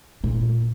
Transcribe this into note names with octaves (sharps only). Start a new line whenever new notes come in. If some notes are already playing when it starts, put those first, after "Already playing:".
A#2